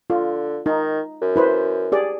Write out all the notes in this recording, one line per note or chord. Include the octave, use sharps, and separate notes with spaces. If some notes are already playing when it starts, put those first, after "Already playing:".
D3 F4
D#3 D#4
F#2
E4 B4 C5
G4 G#4 D5